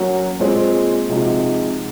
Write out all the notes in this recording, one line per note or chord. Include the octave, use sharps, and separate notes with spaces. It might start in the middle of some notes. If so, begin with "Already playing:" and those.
Already playing: F#3 A#3 C#4 F#4
A#2 G#3 C4
C3 F3 G#3 D#4 F#4